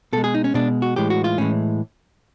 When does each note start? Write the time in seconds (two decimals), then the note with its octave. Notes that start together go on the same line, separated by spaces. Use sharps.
0.13 B2 A4
0.17 G#3
0.24 G#4
0.34 D#4
0.44 C#4
0.54 B2 G#3 D4
0.82 F#4
0.96 A2 E3 G#3 G4
1.10 F#4
1.24 F4
1.38 A2 E3 G#3 C#4